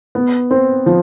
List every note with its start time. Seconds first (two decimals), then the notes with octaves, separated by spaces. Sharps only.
0.15 B3
0.51 C4
0.86 F3